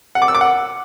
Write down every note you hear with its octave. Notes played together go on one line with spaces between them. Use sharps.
F#5
D6
E6
D6
F#5